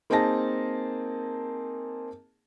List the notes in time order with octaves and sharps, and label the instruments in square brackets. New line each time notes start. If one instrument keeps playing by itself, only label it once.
[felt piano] A#3 C4 D#4 G#4 A5 A#6